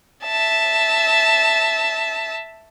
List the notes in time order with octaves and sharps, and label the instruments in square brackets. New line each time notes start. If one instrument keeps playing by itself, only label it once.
[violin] E5 A5